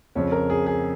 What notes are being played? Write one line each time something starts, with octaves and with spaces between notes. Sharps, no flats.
F2 C#3 F3 C#5
A#4
G#4
G#4